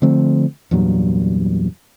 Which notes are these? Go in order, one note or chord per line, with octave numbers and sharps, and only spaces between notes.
D3 F3 A3 C4
E2 G2 A#2 F#3